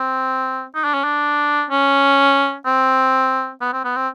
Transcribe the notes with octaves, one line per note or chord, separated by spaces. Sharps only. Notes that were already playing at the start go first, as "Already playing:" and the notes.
Already playing: C4
D#4
D4
C#4
D4
C#4
C4
B3
C4
B3
C4